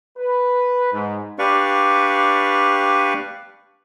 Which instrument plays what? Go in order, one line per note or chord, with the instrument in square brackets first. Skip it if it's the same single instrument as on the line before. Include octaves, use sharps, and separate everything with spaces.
[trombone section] B4
G#2
[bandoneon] D4 G4 B4 D5 F5 C#6